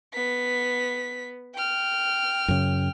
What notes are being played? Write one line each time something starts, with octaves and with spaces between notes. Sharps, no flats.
B3 B6
G5 F6
F#2 C#3